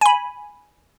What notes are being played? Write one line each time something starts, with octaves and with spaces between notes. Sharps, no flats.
G#5 B5